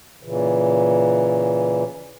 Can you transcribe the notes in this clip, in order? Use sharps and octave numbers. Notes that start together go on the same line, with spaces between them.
A#2 C#3 E3